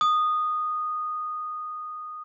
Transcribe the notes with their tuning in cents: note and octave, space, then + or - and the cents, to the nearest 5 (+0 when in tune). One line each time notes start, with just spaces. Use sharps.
D#6 -15